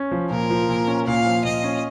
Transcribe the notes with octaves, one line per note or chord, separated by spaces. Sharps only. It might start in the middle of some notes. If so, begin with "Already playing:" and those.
Already playing: C#4
F3
A#2 A#4
F3
A#2
C#4
A#2 F5
F3
A#2 D#5
C#4